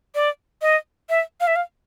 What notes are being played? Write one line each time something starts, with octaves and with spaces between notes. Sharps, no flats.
D5
D#5
E5
F5
E5
F5